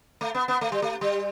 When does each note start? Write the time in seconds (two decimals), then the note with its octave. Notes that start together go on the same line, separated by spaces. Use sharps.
0.21 A3
0.35 B3
0.48 B3
0.61 A3
0.72 G3
0.82 A3
1.01 G3